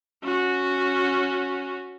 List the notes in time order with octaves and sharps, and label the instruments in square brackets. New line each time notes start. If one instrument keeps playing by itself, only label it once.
[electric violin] C#4 F#4